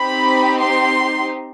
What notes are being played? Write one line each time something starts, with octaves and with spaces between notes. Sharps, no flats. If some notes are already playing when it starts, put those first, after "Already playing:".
Already playing: C4 D#4 G4 B5
C6